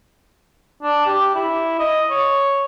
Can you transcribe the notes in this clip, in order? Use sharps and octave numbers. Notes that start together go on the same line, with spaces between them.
D4
G4
E4
D#5
C#5